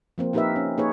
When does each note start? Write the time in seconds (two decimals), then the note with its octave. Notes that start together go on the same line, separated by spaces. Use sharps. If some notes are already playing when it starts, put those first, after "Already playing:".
0.18 F3 A#3 C4
0.33 A#3 D#4 G4 A#4 B4 E5
0.56 C#4
0.78 A#3 D#4 G#4 B4 C#5